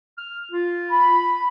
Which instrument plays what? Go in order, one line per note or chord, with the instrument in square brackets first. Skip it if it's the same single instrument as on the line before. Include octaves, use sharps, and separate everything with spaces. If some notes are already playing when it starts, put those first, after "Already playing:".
[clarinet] F6
F4
[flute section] B5